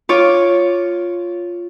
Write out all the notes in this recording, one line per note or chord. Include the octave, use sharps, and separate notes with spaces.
F4 C#5 D6